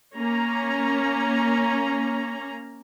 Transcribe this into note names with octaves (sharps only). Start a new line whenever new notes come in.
A#3 C#4 A#5